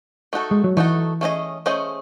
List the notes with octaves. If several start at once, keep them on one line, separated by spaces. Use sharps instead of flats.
A3 D#4 F#4 A4
G#3
F#3
E3 A3 D#4 F#4 A4
A3 C#4 G#4 C5 D#5
A3 C#4 G#4 C5 D#5